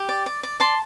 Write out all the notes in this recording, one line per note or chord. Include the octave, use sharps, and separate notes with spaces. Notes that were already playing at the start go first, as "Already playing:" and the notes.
Already playing: G4
D5
D5
D5
D5 A5 C6